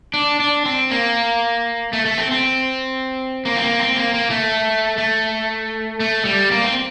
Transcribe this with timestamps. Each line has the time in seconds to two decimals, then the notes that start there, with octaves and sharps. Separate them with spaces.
0.14 D4
0.40 D4
0.65 C4
0.91 A#3
1.93 A3
2.05 A3
2.18 C4
2.31 C4
3.45 A#3
3.56 C4
3.62 A#3
3.79 C4
3.97 A#3
4.14 A#3
4.30 A3
4.98 A3
6.00 A3
6.25 G3
6.51 A#3
6.64 C4